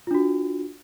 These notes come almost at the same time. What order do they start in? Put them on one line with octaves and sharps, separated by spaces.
F4 D4 F#4